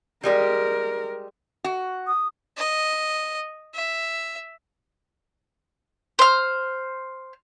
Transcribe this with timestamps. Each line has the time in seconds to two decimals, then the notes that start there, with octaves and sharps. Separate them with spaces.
0.23 G3 G#3 G4 A#4 D5
1.64 F#4
2.07 D#6
2.57 D#5
3.74 E5
6.19 C5 F6